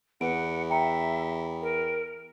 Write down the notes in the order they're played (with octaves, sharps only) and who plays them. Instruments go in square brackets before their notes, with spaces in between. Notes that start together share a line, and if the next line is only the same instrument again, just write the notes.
[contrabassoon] E2 [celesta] B4 D7 [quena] F#5
[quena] E5 [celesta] G5 A#5 C#7
[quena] A#4